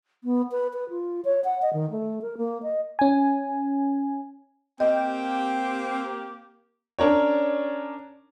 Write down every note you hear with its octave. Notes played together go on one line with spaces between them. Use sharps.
B3
B4
B4
F4
C#5
F#5
D#5
D#3
A3
A#4
A#3
D#5
C#4 G#5
A#3 C4 G4 D#5 G5
C#4 D4 A#4 C#5